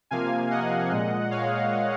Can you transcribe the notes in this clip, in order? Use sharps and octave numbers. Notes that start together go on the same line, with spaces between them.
C3 F3 A#3 F5 G#5
D#5 F#5
A#2 G#3
C#5 F5